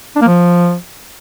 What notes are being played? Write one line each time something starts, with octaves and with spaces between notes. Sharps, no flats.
D4
A#3
F3